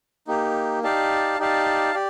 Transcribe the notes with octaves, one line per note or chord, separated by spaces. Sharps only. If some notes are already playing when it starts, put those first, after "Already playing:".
A#3 D#4 G4
D#4 G4 D5 F5 A5
D#4 G4 D5 F5 A5
G4 D5